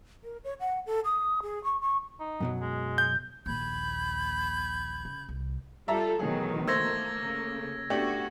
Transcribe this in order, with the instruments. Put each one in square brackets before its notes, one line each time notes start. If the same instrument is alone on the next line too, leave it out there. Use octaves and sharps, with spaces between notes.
[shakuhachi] A#4
C#5
F#5
A4
D#6
G#4
C#6
C#6
[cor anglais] D#4
[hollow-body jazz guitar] F#2 B2 F#3
[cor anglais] G#3
[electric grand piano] G6
[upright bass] A#1 D#2 [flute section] B5 G6 G#6
[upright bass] C#3
C2
[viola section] G3 F4 A4 [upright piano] E5 A5 A#5
[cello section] B2 D#3 E3 [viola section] F#3 A3 [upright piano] G#4
[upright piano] A3 C5 [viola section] A#3 [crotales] E6 G#6 A#6
[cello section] C#3
[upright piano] A3 D4 G4 [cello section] B3 F#4